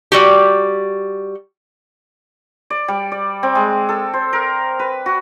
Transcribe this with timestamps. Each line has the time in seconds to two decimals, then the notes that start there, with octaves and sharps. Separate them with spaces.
0.12 G3 F#4 G4
2.70 D5
2.88 G3
3.12 D5
3.43 C4
3.55 G#3
3.89 A4
4.14 C5
4.33 A#4
4.79 B4
5.06 F#4